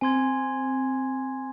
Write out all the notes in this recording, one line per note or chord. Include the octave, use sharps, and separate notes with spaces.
C4 G#5 C6 G#6